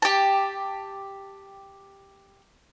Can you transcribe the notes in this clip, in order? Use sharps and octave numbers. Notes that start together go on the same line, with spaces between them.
G4 A5